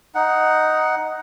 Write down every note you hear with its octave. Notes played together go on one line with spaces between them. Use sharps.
D#4 F#5